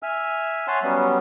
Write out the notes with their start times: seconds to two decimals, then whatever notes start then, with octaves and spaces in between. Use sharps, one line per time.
0.03 E5 G#5 E6 F6
0.68 C#5 F#5 G#5 A5 C6
0.83 F#3 G3 B3 C#4